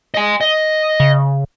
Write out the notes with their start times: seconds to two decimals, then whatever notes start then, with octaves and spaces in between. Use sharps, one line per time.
0.14 D#5 G#5
0.41 D#5
1.00 C#3